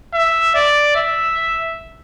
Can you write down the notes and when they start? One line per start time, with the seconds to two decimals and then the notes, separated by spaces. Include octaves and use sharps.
0.14 E5
0.55 D5
0.96 E5